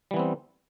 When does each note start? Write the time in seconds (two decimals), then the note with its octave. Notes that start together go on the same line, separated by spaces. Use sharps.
0.11 G3
0.14 E3
0.16 B3
0.19 C4